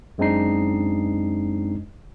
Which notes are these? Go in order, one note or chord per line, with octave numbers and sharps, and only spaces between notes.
F#2 G#3 C4 D4 D#4 C7